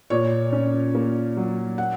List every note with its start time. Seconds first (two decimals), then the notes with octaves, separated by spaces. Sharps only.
0.10 A#2 C#5
0.52 C#4
0.95 A#3
1.37 F#3
1.78 F#5